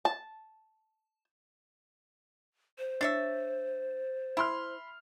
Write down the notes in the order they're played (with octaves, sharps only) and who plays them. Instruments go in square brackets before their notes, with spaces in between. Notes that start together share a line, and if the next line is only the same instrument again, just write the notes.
[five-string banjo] A5
[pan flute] C5
[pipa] D4 C#5 E5 [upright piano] A6
[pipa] E4 [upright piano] B5 C6 F6